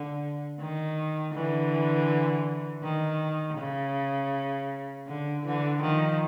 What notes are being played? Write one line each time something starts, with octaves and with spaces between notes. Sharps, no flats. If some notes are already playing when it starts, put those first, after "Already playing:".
Already playing: D3
D#3
D3 E3
D#3
C#3
D3
D3 E3
D#3 F3